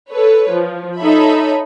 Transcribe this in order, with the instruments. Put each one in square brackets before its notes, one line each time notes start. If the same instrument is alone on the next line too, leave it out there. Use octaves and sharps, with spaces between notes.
[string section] A4 B4 C#5
F3
D#4 A4 C#5 E5 B5